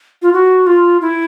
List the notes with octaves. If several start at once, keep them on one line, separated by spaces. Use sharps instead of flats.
F4
F#4
F4
E4